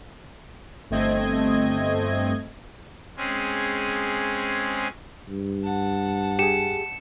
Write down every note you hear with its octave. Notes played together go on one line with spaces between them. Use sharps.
G1 A3 C4 D#5 G#6
G#3 C4 C#4 G#4
G2
F#5 A5
G4 G#4 C#7 E7